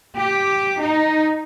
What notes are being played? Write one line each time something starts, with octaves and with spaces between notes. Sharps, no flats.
G4
D#4